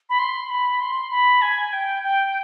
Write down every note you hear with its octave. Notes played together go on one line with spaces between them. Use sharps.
B5
C6
B5
C6
B5
G#5
G5
G5